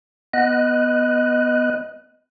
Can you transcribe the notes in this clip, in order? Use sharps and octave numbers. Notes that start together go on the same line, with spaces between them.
B3 D#5 F#6